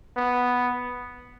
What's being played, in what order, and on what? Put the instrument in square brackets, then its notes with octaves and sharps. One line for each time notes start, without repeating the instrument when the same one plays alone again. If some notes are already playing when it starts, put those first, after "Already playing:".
[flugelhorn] B3